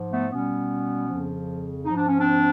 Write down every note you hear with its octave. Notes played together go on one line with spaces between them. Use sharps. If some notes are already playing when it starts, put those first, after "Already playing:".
Already playing: G#2 F3
A3 B3
B2 G3 B3 C#4
F2 C#3 F3
G#2 F3 D#4
D4
C#4
C4 D4